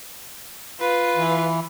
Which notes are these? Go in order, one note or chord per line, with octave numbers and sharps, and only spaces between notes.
F4 B4
E3